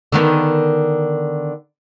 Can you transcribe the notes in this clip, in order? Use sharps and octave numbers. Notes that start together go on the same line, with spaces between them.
D3 D#3 B3